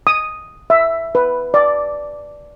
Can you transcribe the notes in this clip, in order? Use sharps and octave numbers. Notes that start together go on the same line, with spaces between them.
D#6
E5
B4
D5